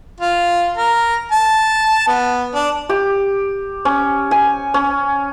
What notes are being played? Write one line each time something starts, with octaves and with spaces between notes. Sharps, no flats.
F4
A#4
A5
B3
D4
G4
C#4
G#5
C#4